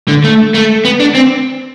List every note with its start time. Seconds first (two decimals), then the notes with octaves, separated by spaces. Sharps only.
0.08 D3
0.24 A3
0.54 A3
0.85 B3
1.00 D4
1.15 C4